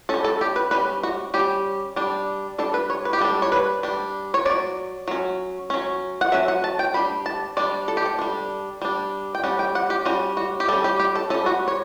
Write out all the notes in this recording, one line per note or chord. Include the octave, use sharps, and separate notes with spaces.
G3 C#4 A4
A4
G4
B4
G3 C#4 B4
F#4
G3 C#4 G4
G3 D4
G3 D4 A4
B4
C#5
B4
G4
G3 D4 A4
C#5
B4
G3 D4
C#5
F#3 C#4 D5
F#3 C#4
F#3 C#4
F#5
F#3 C#4 E5
F#5
A5
G5
G3 D4 B5
A5
G3 D4 D5
A4
G4
A4
G3 D4
G3 D4
G5
G3 C#4 F#5
G5
F#5
G4
G3 C#4 F#4
F#4
G4
G3 C#4 A4
G4
G4
A4
G3 C#4 A4
F#4
C#5